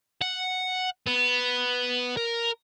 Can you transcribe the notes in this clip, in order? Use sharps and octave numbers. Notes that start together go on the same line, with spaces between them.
F#5
B3
A#4